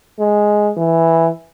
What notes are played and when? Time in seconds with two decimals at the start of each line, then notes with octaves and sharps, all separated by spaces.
0.19 G#3
0.77 E3